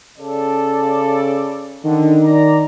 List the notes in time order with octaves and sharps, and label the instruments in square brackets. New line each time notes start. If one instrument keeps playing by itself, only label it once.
[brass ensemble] C#3 A4 D5
[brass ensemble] D3 [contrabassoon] D#3
[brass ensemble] D5 A#5